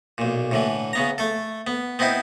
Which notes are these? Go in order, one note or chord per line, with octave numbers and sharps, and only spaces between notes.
B1 A#2
A2 D3 E3
C#3 B3 A#5
A3 A4
B3
B3 C4 D#4 E4 C5